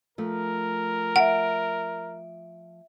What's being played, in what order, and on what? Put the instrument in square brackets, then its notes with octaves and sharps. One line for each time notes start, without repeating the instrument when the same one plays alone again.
[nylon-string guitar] F3 A3 [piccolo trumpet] A#4
[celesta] E5 D7 [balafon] F#5